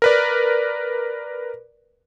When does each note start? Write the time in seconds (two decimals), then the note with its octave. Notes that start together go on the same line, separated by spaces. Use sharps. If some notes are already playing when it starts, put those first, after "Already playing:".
0.02 A#4 B4 D5